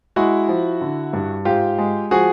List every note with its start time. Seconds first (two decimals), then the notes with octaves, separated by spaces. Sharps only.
0.16 G#3 E4 F#4
0.48 F3
0.81 D3
1.13 G2
1.45 G#2 F4 G4
1.78 G#3
2.11 F3 F#4 G#4